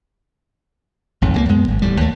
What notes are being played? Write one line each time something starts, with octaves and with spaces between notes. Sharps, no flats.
A1 F2 G#2
C#2 F#3 A#3
F#2 G#3 B3
G#1
E1 D#2 A2 G3
D#2 A3